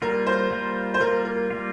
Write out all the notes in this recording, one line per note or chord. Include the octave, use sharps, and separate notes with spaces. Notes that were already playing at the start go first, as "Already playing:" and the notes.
G3 A#3 F4 A#4
C5
G3 A#3 F4
C5
G3 A#3 F4 A#4
A#4
G3 A#3 F4